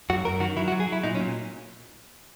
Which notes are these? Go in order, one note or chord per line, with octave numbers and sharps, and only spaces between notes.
F#2 F#4
F#2 A#4
D#3 F#4
F#3 E4
F#4
F#3
G#4
F#3 E4
A#2 D#4
C#4
A#2